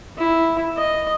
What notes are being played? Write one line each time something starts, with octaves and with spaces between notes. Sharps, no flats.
E4
D#5